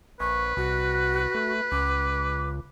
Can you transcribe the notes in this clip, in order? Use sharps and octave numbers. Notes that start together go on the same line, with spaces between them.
A#1 B4 C#6
C2 F#4
A3
C#2 D6